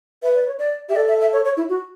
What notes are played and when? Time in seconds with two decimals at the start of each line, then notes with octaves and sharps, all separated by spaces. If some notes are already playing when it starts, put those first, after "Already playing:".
0.23 B4 E5
0.35 D5
0.47 C#5
0.59 D5
0.89 G4 E5
0.96 A4 D5
1.08 E5
1.21 E5
1.33 C#5
1.45 C#5
1.57 E4
1.69 F#4